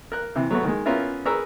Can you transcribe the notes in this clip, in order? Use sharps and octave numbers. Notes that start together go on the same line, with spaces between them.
A#4 F#6
C3 E3
F#3 A3 B3 F#4
D#3 G#3
B3 C#4 F4 A#4 E5
G#4 A#4 B4 A#5 C#6 E6